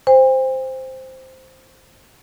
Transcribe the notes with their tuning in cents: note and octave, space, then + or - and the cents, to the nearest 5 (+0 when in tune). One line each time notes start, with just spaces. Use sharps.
C5 +0 G5 +45